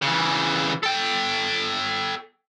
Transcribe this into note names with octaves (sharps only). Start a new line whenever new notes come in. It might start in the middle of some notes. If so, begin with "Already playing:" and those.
C#3 E3
A4 G5